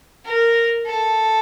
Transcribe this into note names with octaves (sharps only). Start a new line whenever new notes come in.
A#4
A4